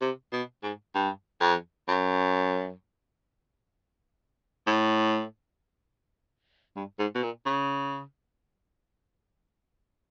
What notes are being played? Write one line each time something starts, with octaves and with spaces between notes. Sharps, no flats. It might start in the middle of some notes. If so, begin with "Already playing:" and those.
C3
B2
G#2
G2
F2
F#2
A2
G2
G#2
B2
A#2
C#3